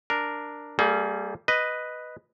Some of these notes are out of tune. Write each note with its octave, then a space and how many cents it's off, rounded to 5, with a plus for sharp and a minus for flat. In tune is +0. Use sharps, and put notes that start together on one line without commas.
D4 +0 A#4 +0
G3 +0 A#3 -40 G#4 +30
B4 +0 D#5 +0